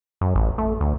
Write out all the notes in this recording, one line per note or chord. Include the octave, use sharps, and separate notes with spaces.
F#2
A1
A3
D2